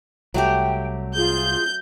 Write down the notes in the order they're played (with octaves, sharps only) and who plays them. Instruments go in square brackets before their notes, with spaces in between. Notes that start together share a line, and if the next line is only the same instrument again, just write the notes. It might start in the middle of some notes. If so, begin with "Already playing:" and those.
[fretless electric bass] C2 [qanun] F#3 A3 G4 [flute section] G5
[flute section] F4 G#4 [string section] G6